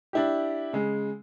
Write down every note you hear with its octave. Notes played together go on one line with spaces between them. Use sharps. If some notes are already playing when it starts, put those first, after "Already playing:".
D4 E4 G4
C#3 G#3